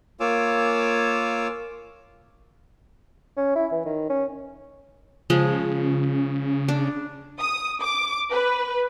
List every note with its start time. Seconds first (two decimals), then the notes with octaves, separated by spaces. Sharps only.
0.20 A#3 F4 C#5 G#5 D6 E6
3.37 C#4
3.56 E4
3.72 E3
3.85 D#3
4.10 C#4
5.30 C#3 F3 G#3
6.68 D4
7.39 D#6
7.81 D6
8.31 B4